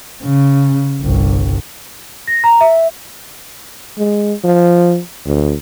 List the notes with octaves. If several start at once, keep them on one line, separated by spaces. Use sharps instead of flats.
C#3
G1 C2
A#6
A#5
E5
G#3
F3
D2